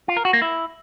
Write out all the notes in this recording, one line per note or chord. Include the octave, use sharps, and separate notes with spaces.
F4
A#4
F#4
A#3
E4